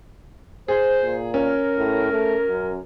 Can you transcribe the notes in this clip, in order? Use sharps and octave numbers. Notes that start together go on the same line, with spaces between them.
G#4 C5
A#2
C#4 A#4
A2
A3
F#2